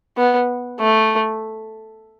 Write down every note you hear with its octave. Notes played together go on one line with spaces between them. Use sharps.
B3
A3